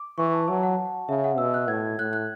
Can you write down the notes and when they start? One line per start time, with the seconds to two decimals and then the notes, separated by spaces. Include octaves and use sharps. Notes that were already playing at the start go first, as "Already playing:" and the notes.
Already playing: D6
0.18 E3 C#6
0.33 A5
0.48 F#3 A5
0.63 F#5
1.08 C#3 E5
1.24 F#5
1.38 B2 E6
1.54 F#6
1.68 A2 G#6
1.99 A2 F#6
2.13 F#6